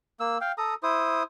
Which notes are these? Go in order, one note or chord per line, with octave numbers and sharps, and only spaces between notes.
A#3 E6
F5 G5
A4 A#5 D#6
E4 C5 D#6